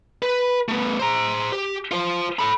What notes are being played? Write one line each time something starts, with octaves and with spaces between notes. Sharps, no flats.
B4
A3 B3
C5 A#5
G4
F4 C5
A4 B5